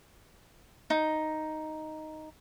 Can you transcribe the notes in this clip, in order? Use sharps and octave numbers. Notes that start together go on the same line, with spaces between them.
D#4